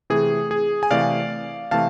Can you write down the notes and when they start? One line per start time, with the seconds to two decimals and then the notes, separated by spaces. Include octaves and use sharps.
0.10 C3 E3 A3 G#4
0.51 G#4
0.83 G#5
0.90 C3 E3 A3 D5 F5
1.71 C3 E3 A3 F5 A5